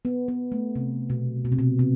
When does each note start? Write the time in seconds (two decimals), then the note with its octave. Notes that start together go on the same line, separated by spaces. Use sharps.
0.05 B3
0.28 B3
0.52 A3
0.76 C3
1.10 B2
1.45 B2
1.52 C3
1.59 B2
1.79 C3